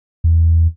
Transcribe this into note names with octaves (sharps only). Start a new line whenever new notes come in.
E2